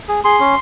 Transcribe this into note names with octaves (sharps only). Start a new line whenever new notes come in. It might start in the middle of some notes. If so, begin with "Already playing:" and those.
G#4
G#4 C6
C#4